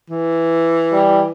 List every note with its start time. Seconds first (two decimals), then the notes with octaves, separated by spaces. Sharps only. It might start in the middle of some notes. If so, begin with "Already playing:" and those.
0.10 E3
0.92 G3